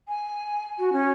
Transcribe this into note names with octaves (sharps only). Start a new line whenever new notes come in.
G#5
F#4
C#4